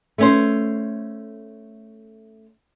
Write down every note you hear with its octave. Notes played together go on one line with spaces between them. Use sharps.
A3 C#4 C5